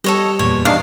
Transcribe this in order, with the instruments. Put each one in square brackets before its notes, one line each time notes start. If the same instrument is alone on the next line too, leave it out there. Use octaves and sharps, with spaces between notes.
[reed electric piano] G3 G4 [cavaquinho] A4 C#5 D#5
[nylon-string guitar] E2 A#2 [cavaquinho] C#5
[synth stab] D#3 D4 [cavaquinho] F5